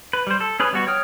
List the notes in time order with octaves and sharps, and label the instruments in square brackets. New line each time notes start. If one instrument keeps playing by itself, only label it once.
[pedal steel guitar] B4
G3 C5
A4
C#4 G#4 B4 C#5
G3 B3 F#4 C#6
C#5 G5 D#6 F6